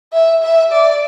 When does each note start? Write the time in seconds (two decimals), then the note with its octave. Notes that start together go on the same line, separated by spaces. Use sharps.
0.13 E5
0.43 E5
0.72 D5